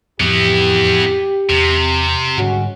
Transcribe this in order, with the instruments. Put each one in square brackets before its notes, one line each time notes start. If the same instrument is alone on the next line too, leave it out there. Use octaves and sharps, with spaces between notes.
[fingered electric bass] F2 A2 F3 [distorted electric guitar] E3 B3 [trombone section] G4
[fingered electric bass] E2 [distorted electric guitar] C3
[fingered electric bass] G#2 D3 G3 [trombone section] G#3 C#4 F#4